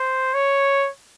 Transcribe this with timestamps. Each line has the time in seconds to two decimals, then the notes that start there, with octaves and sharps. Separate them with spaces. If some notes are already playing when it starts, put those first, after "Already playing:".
Already playing: C5
0.34 C#5